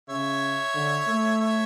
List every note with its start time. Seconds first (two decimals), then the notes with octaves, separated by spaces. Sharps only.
0.09 C#3 C#5 E5
0.75 D3
1.07 A3
1.41 C#5 E5